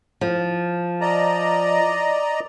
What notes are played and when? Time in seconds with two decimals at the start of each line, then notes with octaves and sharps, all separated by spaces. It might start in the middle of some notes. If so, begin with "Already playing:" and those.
0.21 F3
1.01 D5 D#5 A#5